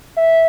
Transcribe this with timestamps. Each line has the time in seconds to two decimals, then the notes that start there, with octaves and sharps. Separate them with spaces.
0.17 E5